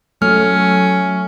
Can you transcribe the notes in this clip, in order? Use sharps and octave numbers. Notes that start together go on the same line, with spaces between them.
F#3 A3 C#4 F6